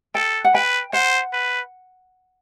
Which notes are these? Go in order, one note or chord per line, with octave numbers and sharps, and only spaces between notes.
A4 G5
F#5
B4 G5
C5 F#5
B4